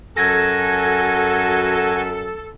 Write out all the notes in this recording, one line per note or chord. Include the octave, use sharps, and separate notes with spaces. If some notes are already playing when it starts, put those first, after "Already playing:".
F#2 F#4 A4 G#5 G#6 A#6